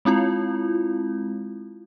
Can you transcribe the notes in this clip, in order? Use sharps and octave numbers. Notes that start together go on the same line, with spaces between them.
G#3 C4 E4 F4